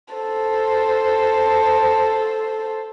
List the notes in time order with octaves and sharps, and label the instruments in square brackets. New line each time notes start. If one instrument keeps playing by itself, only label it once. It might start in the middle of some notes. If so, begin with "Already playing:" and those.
[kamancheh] A4 C5